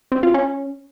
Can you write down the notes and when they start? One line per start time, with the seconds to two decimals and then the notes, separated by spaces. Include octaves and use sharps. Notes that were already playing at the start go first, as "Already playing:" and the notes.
0.12 C4
0.23 F4
0.34 C#4